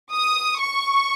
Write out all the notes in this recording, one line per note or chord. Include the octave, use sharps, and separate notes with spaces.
D#6
C#6